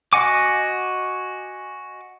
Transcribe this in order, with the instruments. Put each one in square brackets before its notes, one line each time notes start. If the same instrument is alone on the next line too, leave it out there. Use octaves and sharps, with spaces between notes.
[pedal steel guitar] F#4 D#5 F#5 G#5 D6